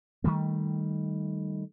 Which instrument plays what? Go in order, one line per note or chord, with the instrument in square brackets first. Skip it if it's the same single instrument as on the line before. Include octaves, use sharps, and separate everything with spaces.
[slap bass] D#3 G3 A3